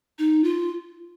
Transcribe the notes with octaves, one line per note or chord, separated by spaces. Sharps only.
D#4
F4